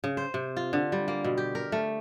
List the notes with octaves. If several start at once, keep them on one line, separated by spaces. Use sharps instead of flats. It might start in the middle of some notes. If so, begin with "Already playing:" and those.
C#3
C5
C3
F4
D3
G3
A#3
B2
G4
A#4
A3